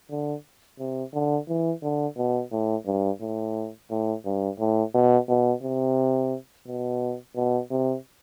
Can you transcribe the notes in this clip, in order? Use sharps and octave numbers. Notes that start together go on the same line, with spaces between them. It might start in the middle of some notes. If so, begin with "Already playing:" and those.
D3
C3
D3
E3
D3
B2
A2
G2
A2
A2
G2
A2
B2
B2
C3
B2
B2
C3